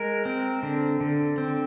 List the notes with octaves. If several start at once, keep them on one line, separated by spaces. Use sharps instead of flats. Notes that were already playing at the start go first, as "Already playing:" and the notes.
Already playing: G#3 A#4
C4
D3
D3
C4